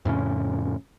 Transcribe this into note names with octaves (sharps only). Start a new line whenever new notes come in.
F2 A2 C#3 C#4